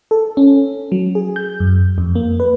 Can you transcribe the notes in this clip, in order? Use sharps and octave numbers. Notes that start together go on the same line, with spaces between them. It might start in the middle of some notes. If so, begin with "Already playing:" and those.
A4
C#4
F#3
G#4
G6
F#2
F2
A#3
B4